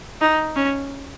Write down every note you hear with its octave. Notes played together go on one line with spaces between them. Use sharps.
D#4
C#4